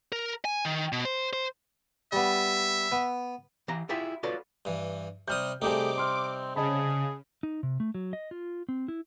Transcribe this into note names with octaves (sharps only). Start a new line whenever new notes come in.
A#4
G#5
D#3
B2
C5
C5
G3 B3 E5
B3
E3 G4 A#5
E4 F4 G4 G#4 E5 G5
F4 F#4 A4 B4 C#5 D5
G2 E3
C3 G3 D#6 F6 G6
C3 G3 A3 D#4 G4 G#4 D6
C4 C6 F6
C#3 G#4 D#5 A5 B5
D#4
C3
A3
F#3
D#5
F4
C4
E4